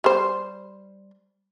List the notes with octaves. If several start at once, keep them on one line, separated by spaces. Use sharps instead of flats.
G3 C5